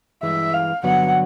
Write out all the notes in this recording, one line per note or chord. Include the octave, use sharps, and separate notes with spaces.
G2 E3 G#3 E5
F5
G2 D3 F#3 B3 F#5